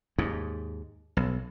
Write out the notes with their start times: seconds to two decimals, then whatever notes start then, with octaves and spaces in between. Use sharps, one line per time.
0.18 D#2 G#2
1.17 B1